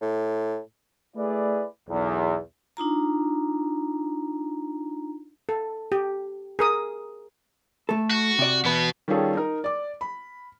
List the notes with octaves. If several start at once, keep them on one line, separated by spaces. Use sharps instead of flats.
A2
A3 E4 G#4 B4 D5
B1 E2
D4 D#4 F4 A#5
A4
G4
G#4 A#4 D#6
A3 A4
F#4
C3 D5
E2 B2 B3 B4
D#3 G3 C#4 F4 G#4 A4
D#4 A#4
D5 D6
B5